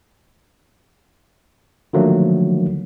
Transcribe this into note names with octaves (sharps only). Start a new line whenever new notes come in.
D3 D#3 F3 F#3 A3 A#3